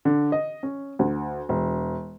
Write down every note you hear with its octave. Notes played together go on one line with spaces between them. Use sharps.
D3
D#5
C#4
D2
E1